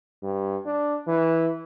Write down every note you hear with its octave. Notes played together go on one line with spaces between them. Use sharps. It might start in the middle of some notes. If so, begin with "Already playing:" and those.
G2
D4
E3